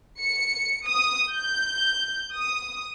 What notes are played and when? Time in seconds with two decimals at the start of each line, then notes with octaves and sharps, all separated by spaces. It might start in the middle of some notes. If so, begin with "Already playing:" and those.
0.21 C#7
0.87 D#6
1.31 G6
2.34 D#6